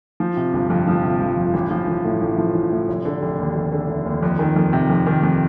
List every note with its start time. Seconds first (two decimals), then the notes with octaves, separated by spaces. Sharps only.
0.20 F3
0.37 C3
0.53 G1
0.70 F2
0.87 F3
1.03 C3
1.21 G1
1.37 F2
1.54 A1
1.71 F3
1.87 A1
2.04 A2
2.21 A1
2.38 F3
2.55 A1
2.71 A2
2.89 F1
3.05 D3
3.22 F1
3.39 D#2
3.55 F1
3.72 D3
3.89 F1
4.06 D#2
4.22 F2
4.39 D#3
4.56 F2
4.73 C3
4.90 F2
5.06 D#3
5.23 F2